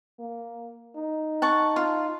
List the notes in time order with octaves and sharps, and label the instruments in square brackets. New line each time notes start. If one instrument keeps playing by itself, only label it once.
[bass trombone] A#3
D#4
[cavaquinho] F#5 A5 C#6
F4